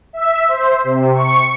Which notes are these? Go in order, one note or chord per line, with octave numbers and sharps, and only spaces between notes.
E5
C5
C3
C#6